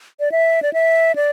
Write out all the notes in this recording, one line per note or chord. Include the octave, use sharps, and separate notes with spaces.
D5
E5
D5
E5
D5